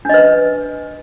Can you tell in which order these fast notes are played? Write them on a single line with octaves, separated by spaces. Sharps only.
D4 D#5 B4